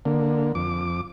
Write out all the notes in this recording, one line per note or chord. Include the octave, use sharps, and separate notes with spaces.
D3 A#3
F2 D6